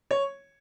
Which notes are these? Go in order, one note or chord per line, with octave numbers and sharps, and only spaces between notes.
C#5